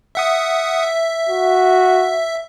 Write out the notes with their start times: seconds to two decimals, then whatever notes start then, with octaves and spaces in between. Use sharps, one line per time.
0.15 E5 F#5 D#6
0.83 E5
1.29 F#4